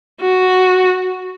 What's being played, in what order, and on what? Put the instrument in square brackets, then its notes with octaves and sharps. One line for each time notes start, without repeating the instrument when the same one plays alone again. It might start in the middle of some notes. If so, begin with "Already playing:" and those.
[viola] F#4